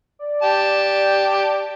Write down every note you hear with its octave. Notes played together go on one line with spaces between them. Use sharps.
D5
G4 A5